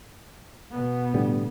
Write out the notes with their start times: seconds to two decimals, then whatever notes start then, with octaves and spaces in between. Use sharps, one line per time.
0.71 B2 B3
1.14 A2 D3 G3